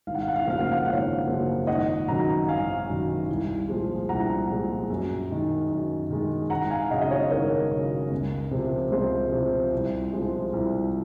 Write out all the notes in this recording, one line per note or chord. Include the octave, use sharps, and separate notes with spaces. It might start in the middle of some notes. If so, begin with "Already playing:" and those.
G#1 F5
F#5
F5
F#5
F5
F#5
F#2 C#3 F3 A#3 F5
F#5
F5
F#5
F5
G#1 F#5
C#5 F5
F#2 C#3 F3 A#3
G#1 D#5 F#5
F#2 D#3 F#3 F#5 A#5
G#1 F5 G#5
F#2 D#3 F#3
C2
A#2 F3 G#3
C2 F#5 A#5
A#2 F3 G#3
F#2
D#3 G#3
F#2
D#3 G#3
G#1 F#5 A#5
F5 G#5
F#2 C#3 D#5 F#5
D#5
C#5 F5
G#1 A#4 C#5
F#2 C#3
C#2
C3 F3
C#2 G#4 C5
C3 F3
C2
C3 F3 G#3
C2